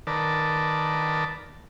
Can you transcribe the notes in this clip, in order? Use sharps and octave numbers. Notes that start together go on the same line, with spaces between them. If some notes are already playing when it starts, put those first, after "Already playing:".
D#3 A#4 B4 D5 A5